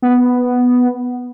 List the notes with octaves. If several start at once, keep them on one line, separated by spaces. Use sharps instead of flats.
B3